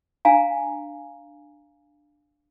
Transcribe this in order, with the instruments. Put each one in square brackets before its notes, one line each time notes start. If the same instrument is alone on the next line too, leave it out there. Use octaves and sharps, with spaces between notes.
[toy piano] D4 F5 G#5 A#5